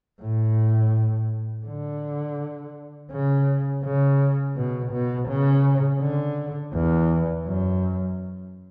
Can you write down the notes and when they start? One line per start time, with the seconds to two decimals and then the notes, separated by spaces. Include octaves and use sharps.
0.21 A2
1.66 D3
3.12 C#3
3.84 C#3
4.56 B2
4.92 B2
5.29 C#3
6.01 D3
6.74 E2
7.46 F#2